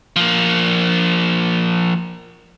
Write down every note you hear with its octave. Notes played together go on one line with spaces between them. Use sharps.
F3 A#3